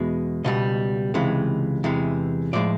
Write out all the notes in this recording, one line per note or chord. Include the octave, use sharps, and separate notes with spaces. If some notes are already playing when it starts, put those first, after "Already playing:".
Already playing: E2 B2 G#3
C#2 B2 G3 D#5
C#2 C3 E3 G#3
E2 C3 E3 G#3
A2 F3 G#3 D5